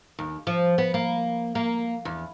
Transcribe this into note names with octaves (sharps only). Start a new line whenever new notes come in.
D#2
F3
B3
A#3
A#3
E2